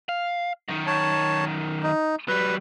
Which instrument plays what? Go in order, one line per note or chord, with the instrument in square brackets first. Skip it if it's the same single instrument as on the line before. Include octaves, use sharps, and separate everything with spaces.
[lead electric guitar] F5
F#2 D#3
[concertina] C#5 A5
D#4
[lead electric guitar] F#3 G3 [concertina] B4